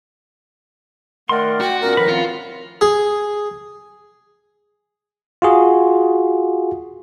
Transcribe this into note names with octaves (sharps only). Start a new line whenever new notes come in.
D#3 A3 A#4 D5 F#5 C6
F#4 G5
A#2 B3 C#4 A#4
A2 D#3 F3 B4
C4 F4 F#5
G#4
F4 F#4 G#4